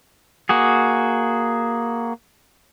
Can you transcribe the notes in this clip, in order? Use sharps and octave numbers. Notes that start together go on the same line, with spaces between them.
A#3 F#4 G#4